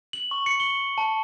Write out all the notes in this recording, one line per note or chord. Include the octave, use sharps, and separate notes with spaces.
F#7
C#6
C#7
G7
A5